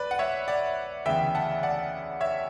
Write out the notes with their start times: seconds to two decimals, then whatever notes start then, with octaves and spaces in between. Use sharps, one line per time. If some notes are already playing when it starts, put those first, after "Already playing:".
Already playing: B1 B4 D5
0.11 F#5
0.19 C#5 E5
0.48 D5 F#5
1.06 D2 C#3 E3 B3 E5 G5
1.35 F#5 A5
1.63 D5 F#5
2.21 C#5 E5